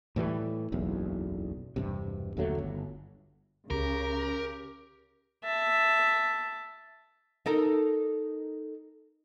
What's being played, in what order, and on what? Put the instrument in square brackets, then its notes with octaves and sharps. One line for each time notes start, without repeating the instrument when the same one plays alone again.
[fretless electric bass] A2 E3 F#3 G3
F#1 B1 E2
E1 G2 C3
D#2 D3 F#3 A3
G1
[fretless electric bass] C#2 [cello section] C#3 [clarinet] G4 [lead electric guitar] A#4
[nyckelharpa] E5 A5
[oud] D#4 A4 A#4